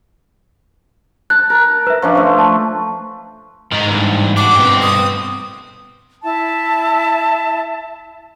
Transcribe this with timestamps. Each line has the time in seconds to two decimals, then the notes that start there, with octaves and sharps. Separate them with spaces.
1.30 A5 F#6
1.50 A#4
1.87 B4 E5
2.02 F3 C#4 D4
2.15 A3 C6
2.39 A5
3.72 G#2 D#3 A#5
3.89 G2 E3
4.37 D4 F#4 D6
4.56 G2 B2 C4 B4 G5
4.82 D#6
6.23 E4 E5 A5